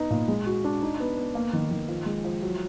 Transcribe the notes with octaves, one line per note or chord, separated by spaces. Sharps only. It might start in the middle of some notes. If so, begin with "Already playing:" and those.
Already playing: B3 D#4
A#2
G#3
F#4
D4
D#4
B3
B3
A#3
D#3
D#3
F3
G#3
F3
F#3